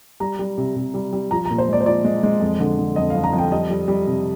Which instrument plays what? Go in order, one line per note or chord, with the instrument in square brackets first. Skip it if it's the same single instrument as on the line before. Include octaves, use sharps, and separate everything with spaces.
[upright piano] G3 A#5
G3
C3
C3
G3
G3
F3 A#5
A#5
A#2
C5
G#3 D5
C5
F3 D5
G#3
G#3
F2
D3
D3
F2 D#5
F5
F2
A#5
F2
G5
G3 D#5
G3
G3
C3